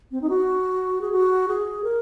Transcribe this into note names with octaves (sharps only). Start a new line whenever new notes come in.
C4
D#4
F#4
G#4
F#4
G#4
A#4